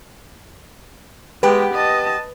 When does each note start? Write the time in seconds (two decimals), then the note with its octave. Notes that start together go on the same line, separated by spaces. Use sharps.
1.43 G#3 B3 G4 B4 G5
1.74 D#5 A5